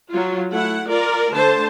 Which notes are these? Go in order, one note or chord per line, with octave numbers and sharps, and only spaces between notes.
F#3 F4
A3 E4 F#5
F4 A#4 D5
D3 A3 C5 A5